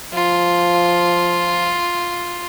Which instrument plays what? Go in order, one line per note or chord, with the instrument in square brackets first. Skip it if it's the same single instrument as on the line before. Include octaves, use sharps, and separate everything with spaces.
[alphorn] F3 [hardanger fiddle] F4